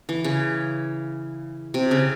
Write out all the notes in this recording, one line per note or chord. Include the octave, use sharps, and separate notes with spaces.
E3
C#3
C3
C#3